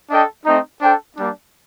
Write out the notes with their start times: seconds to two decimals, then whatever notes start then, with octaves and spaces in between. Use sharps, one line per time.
0.11 D4 A4 D#5 G5
0.46 A3 C4 D#4
0.81 D4 A4 C5 G5
1.17 G3 A#3 D4